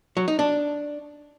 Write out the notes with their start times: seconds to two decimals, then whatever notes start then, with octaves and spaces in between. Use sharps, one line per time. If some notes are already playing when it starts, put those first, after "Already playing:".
0.17 F#3
0.28 D#4
0.39 D4